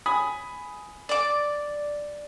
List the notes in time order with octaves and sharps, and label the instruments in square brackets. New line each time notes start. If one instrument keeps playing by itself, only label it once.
[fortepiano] G#5 B5 D#6
[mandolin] D5 D6